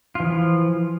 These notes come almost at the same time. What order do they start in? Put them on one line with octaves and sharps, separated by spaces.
F4 E3 F3